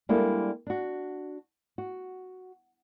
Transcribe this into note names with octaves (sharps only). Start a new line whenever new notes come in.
G3 G#3 A#3 D4 E4 A4
D4 F#4
F#4